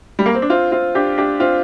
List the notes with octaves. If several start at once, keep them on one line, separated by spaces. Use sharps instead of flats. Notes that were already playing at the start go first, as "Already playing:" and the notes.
G3
A#3
C4
D4
C4 F4
C4 F4
D4 G4
D4 G4
C4 F4